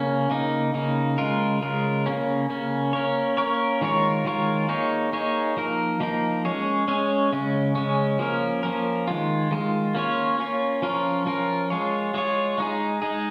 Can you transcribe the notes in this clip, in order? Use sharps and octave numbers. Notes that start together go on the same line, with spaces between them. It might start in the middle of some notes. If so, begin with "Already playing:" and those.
Already playing: C#3 A#3 C#4
C#3 A#3 D#4
C#3 A#3 D#4
C#3 G#3 F4 A#4
C#3 G#3 F4 A#4
C#3 A#3 C#4
C#3 A#3 C#4
A#3 C#4 A#4 C#5
A#3 C#4 A#4 C#5
D#3 G#3 F4 A#4 C#5
D#3 G#3 F4 A#4 C#5
A#3 D#4 G#4 C#5
A#3 D#4 G#4 C#5
F3 A#3 D#4 A#4
F3 A#3 D#4 A#4
G#3 C#4 G#4 C#5
G#3 C#4 G#4 C#5
C#3 G#3 C#4
C#3 G#3 C#4
F3 A#3 C#4 A#4
F3 A#3 C#4 A#4
D#3 G#3 F4
D#3 G#3 F4
A#3 C#4 F4 C#5
A#3 C#4 F4 C#5
F3 C#4 F4 A#4
F3 C#4 F4 A#4
G#3 F4 G#4 C#5
G#3 F4 G#4 C#5
G#3 D#4 G#4
G#3 D#4 G#4